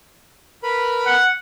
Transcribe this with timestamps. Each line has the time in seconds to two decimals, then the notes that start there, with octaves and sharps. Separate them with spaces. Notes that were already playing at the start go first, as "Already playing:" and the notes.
0.63 A#4 B4 B5
1.06 F#5